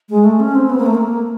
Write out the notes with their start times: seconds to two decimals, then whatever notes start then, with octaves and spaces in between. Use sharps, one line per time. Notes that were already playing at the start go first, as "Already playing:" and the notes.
0.09 G#3
0.24 A3
0.40 C#4
0.55 C4
0.70 B3
0.78 A#3
0.86 A3
0.95 A#3